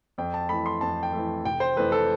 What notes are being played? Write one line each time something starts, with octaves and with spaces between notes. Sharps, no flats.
F2 G5
A5
E3 A3 B5
C6
F2 A5
G5
E3 A3
F1 G5
C5
F2 E3 A3 B4
A4